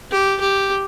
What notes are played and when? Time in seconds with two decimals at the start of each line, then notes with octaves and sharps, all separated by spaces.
0.11 G4
0.41 G4